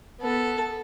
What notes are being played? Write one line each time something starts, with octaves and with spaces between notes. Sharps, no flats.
B3 A4